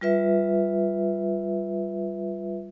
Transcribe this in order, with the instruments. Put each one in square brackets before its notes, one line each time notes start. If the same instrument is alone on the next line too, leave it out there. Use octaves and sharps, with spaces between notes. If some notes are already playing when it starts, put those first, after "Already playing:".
[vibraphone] G3 F4 B4 E5